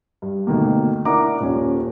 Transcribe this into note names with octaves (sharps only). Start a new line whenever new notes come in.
G2
D2 B2 D#3 A#3
D4 E4 A#4 F#5 A#5 D6
D#1 C#4